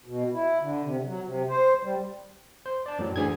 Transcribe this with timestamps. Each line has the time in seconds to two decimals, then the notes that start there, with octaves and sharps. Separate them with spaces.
0.06 B2
0.33 E4
0.60 D3
0.84 C3
1.05 F#3
1.24 C3
1.49 C5
1.83 G3
2.66 C5
2.86 D5 A5
2.99 F#2 A2 F#3
3.16 D2 E3 G#4 G#6